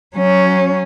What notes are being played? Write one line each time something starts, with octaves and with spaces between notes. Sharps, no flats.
F#3 C#4